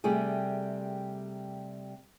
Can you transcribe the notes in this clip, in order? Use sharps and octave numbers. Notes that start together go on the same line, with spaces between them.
C3 G3 A3 G#4